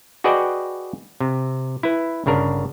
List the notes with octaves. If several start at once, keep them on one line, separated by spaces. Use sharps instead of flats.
F#4 G#4 B4 D5 D#5 G5
C3
E4 B4
G1 C#3 D4 A#4